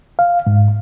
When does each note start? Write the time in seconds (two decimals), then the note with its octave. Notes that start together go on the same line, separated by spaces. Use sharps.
0.19 F5
0.47 G#2